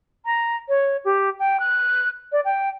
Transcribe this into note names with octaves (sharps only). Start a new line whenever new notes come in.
A#5
C#5
G4
G5
F#6
D5
G5